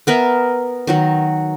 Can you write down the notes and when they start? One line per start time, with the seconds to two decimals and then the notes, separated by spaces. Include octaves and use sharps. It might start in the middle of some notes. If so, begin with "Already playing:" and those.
0.07 B3 A#4 B4 E5
0.87 D#3 F#3 F#4